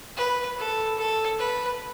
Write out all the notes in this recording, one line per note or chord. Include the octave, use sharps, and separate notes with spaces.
B4
A4
A4
B4